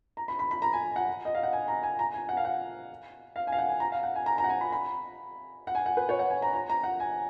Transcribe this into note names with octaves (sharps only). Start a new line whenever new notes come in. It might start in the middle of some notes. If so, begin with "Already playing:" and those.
A#5
B5
B5
B5
A#5
G#5
F#5
D#5
F5
F#5
G#5
A#5
G#5
A#5
G#5
F#5
F5
F#5
F5
G#5
F5
F#5
G#5
A#5
F5
F#5
G#5
A#5
A#5
F#5
G#5
B5
B5
F#5
G#5
F#5
B4
C#5
F#5
G#5
A#5
A#5
A#5
F#5
G#5